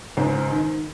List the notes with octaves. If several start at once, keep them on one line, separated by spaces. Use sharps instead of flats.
C#2 G#2 C4
D#3